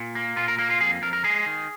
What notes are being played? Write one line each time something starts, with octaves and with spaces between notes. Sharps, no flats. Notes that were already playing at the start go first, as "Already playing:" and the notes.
Already playing: A#2
A#3
A#2 F4
A#4
A#3 A#4
F4
F2 G#4
F2 A#4
A#4
G#3 G#4
D#3